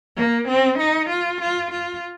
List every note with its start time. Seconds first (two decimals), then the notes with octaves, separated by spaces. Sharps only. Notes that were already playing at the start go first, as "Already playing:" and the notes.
0.17 A#3
0.48 C4
0.79 D#4
1.09 F4
1.41 F4
1.71 F4